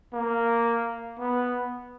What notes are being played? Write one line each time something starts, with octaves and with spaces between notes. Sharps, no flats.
A#3
B3